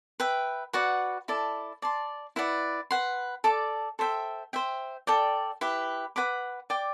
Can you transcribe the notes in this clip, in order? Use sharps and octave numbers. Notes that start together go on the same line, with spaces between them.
B4 E5 G5
F#4 B4 D5 F#5
E4 A4 D5 A5
D5 A5 C6
E4 B4 D5 F#5
B4 F#5 C6
A4 D5 A5 D6
A4 C5 E5 G5
C5 E5 G5
A4 D5 G5
E4 G4 B4
B4 F#5 B5 D6
D5 G5 D6